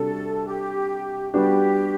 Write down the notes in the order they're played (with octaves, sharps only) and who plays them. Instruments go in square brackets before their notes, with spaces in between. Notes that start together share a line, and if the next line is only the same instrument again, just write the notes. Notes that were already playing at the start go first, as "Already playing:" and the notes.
Already playing: [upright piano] C3 G3 D4 F#4 [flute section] A4
[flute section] G4
[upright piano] G3 B3 D4 F#4 [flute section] G4